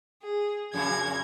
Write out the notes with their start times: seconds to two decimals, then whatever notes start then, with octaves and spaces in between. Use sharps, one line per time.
0.22 G#4
0.74 F2 A#2 C#3 G#6